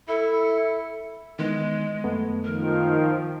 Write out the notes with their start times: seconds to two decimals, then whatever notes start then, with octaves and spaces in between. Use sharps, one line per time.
0.08 E4 A4
1.39 D#3 E3 G#3 B3
2.04 F#2 A3 B3
2.44 D#3 F3 A#4